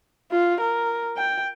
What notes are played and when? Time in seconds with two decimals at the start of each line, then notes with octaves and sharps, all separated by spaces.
0.31 F4
0.60 A#4
1.17 G5